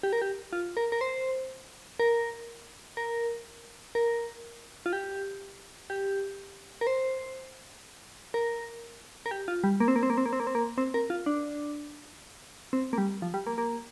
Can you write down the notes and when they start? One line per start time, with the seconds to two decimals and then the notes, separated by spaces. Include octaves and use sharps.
0.03 G4
0.13 A#4
0.22 G4
0.53 F4
0.77 A#4
0.92 A#4
1.01 C5
2.00 A#4
2.97 A#4
3.95 A#4
4.86 F4
4.93 G4
5.90 G4
6.81 A#4
6.87 C5
8.34 A#4
9.26 A#4
9.31 G4
9.48 F4
9.64 G3
9.80 A#3
9.88 C4
9.96 A#3
10.03 C4
10.10 A#3
10.17 C4
10.26 A#3
10.33 C4
10.40 A#3
10.47 C4
10.55 A#3
10.78 C4
10.94 A#4
11.10 F4
11.26 D4
12.73 C4
12.93 A#3
12.98 G3
13.22 F3
13.34 G3
13.47 A#3
13.58 A#3